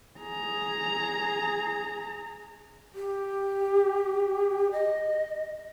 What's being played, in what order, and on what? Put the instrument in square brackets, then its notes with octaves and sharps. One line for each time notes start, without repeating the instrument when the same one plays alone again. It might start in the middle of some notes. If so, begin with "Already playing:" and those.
[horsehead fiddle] G#4 A#5
[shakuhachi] G4
D#5